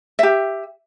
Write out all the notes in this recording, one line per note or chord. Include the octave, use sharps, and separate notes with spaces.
G4 E5